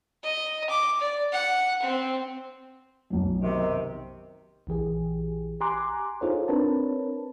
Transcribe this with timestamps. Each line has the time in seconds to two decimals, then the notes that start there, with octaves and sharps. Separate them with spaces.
0.23 D#5
0.69 D6
1.00 D5
1.32 F#5
1.82 C4
3.10 B1 F#2
3.41 C3 D#3
4.67 A#1 E3 G4 G#4
5.60 G4 G#5 A#5 C6 D6 F#6
6.21 D#4 F4 G#4 A4 C5 C#5
6.48 C4 D4 A#4 B4 C#5 A5